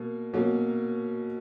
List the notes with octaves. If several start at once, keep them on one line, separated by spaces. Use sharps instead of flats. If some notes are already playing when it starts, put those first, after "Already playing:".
Already playing: B2 A#3
B2 F#3 A#3 C#4